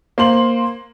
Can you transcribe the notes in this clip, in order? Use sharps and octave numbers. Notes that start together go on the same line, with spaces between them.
A#3 C5 C6 F#7